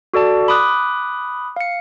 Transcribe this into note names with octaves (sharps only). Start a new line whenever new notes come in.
F#4 A4 D5 A5
B5 D6 D#6 F#6
F5 C#7